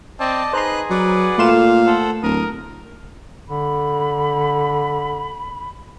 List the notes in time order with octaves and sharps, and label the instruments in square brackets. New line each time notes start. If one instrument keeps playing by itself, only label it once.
[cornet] C4 [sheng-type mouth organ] D5 D#5 A5
[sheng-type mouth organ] D#4 B4 F#6 [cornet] G#4 [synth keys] C5 A#5 C6
[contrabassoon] F#3 [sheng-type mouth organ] B4 D5 F#5
[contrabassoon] A#2 [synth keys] A3 C6 E7 [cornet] F5
[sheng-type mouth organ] A4 C5 F#5
[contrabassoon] D1 [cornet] A#4 [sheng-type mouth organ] D#6
[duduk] D3 [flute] B5